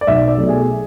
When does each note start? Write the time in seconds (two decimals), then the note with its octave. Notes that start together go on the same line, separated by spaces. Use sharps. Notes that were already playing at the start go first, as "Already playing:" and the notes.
0.01 D5
0.07 B1 E5
0.28 D5
0.38 B2 F#3 A3
0.49 G#4